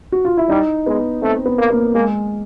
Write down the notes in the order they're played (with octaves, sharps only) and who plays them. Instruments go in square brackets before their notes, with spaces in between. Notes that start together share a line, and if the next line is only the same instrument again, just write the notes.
[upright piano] F#4
F4
E4
[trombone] G3 [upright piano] D#4
[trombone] G#3 [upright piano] B3
[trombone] A3 [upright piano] C4
[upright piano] B3
[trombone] A#3
[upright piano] A#3
[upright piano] G#3 [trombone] A#3